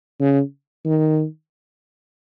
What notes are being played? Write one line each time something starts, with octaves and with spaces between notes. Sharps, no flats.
C#3
D#3